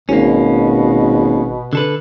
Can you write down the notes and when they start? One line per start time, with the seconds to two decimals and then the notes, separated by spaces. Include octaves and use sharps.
0.09 G#1 B2 A#3 C#4
1.73 D3 A4 B4